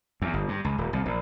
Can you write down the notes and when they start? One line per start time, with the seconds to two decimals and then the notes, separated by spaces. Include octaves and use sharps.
0.22 E2
0.34 G1
0.48 G2
0.65 C#2
0.78 D#1
0.93 C2
1.06 A#1